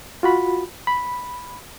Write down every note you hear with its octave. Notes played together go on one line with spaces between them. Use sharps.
F4 F#4 B5
B5